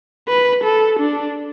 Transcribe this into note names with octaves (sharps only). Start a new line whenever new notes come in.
B4
A4
D4